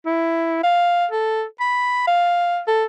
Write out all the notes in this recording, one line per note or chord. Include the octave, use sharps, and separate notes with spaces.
E4
F5
A4
B5
F5
A4